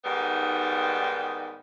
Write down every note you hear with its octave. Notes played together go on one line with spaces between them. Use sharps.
G#2 D#3 G3 B3